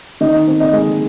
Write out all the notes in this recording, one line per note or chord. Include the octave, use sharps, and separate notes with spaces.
D#3 D#5
C4
D#5
G#3